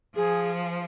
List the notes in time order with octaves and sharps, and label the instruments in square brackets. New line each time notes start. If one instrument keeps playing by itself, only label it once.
[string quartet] F3 [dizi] G#4